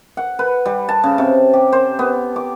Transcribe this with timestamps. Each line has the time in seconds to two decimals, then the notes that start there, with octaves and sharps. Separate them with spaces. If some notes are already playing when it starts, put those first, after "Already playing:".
0.17 F#5
0.39 B4
0.66 G3
0.89 A5
1.04 C#3
1.18 C3
1.53 G4
1.72 C5
1.99 B3
2.36 D6